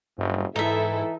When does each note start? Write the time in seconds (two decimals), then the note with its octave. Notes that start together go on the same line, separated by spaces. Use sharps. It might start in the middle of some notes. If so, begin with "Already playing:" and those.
0.18 F#1 G2
0.56 G#2 E3 D#4 E4 A4 E5